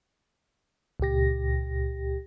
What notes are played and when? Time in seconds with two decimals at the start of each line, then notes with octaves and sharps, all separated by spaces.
1.00 C#2 A#2 G4 A#6